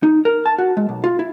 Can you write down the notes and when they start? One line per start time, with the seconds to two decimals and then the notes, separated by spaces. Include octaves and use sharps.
0.03 D#4
0.25 A#4
0.46 A5
0.58 F#4
0.77 G#3
0.89 B1
1.04 F4
1.19 E4